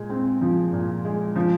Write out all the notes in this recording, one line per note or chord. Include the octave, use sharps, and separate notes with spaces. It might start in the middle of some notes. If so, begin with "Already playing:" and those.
Already playing: A#2 G#3
C4
F3
A#2
G#3
F3